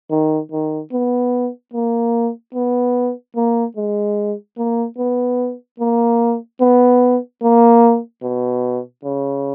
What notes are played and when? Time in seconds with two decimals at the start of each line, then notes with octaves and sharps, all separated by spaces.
0.11 D#3
0.52 D#3
0.93 B3
1.74 A#3
2.55 B3
3.36 A#3
3.77 G#3
4.58 A#3
4.98 B3
5.80 A#3
6.61 B3
7.42 A#3
8.23 B2
9.04 C#3